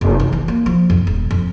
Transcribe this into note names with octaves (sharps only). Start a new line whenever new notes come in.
F1
E3
E3
A#3
F3
F2
D#1
F2